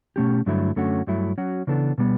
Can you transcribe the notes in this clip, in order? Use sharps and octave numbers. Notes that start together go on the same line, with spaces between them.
B2 A3 C#4 G4
G2 D3 F#3 A3 E4
F#2 D3 A3 C#4 F#4
G2 F#3 A3 E4
F#3 C#4 F#4
C#3 E3 B3 D4 A4
B2 G3 B3